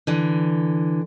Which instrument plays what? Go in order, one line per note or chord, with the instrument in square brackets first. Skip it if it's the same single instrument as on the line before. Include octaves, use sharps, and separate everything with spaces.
[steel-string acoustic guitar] D3 E3